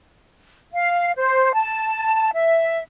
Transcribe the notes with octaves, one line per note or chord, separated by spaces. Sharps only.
F5
C5
A5
E5